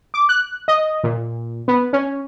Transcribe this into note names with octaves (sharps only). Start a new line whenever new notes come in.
D6
F#6
D#5
A#2
B3
C#4